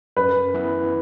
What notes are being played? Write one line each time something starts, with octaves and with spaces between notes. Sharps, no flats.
F#2 B4
E3 B3 E4